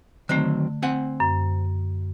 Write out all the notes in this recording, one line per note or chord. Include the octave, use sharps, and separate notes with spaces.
D3 D#3 F#3 A3 C4
C4 F#5 G#5
F#2